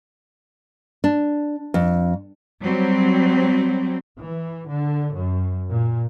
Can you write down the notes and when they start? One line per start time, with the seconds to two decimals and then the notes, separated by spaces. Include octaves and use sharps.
1.04 D4
1.74 F2
2.61 F#3 G3 C4
4.19 E3
4.70 D3
5.15 F#2
5.69 A#2